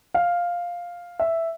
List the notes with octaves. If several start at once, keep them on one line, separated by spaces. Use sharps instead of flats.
F5
E5